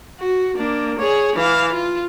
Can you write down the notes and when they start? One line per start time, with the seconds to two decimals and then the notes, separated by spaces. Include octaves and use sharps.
0.19 F#4
0.56 A#3 D4
0.99 G#4 C#5
1.36 E3 F5
1.72 F4